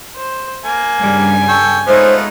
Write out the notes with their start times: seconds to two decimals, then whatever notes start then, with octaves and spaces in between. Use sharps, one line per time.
0.16 C5
0.65 A#3 G#5
0.99 G2 C#3 G3
1.49 A4 G5 C#6
1.87 G#3 A3 B3 D#4 F4 C5 C#5